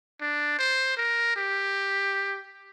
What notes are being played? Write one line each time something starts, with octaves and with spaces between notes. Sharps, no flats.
D4
C5
A#4
G4